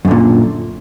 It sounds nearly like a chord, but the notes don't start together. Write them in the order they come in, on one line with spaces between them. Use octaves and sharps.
F#2 D3 A#2